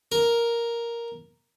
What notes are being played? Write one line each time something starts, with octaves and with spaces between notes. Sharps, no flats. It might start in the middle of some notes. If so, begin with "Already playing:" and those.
A#4